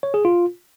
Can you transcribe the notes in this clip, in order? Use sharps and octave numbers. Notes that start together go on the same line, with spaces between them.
C#5
G#4
F4